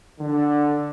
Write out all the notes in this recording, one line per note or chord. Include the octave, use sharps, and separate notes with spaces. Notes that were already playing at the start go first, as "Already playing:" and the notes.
D3